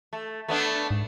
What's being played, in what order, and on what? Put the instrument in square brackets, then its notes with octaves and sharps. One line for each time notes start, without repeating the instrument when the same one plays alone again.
[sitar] A3
A3 B3 D4
[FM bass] G#2